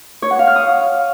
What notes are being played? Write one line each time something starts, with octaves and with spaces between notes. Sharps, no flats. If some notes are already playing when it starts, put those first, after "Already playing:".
C#5
F#5
F5
F6
D#6